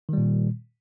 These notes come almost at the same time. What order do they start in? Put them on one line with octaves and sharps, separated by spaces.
D#3 G3 A#2